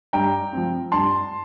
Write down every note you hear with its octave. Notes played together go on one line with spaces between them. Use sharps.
G2 G5 A#5
F3 C4
G2 A5 C6